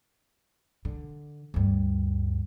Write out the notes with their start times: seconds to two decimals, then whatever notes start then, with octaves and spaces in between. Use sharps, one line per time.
0.85 D3
1.54 D2 G2